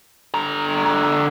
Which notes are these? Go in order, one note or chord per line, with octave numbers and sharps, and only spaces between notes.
D3 A#5